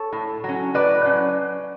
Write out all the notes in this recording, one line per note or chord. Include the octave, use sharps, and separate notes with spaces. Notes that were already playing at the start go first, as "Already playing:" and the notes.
Already playing: A4 C#5
A2
F#3 C#4
A2 B4 D5
F#3 C#4